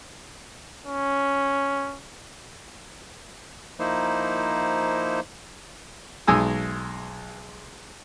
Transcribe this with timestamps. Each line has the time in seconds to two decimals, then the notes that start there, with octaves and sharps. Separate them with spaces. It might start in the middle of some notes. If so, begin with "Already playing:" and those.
0.86 C#4
3.79 F3 A#3 D#4 E4 C5
6.27 B1 G#3 G#5 D#6 E6